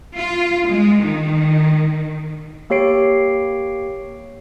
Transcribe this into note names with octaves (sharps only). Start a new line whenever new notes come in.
F4
G#3
D#3
A#3 G4 C#5 C7 D7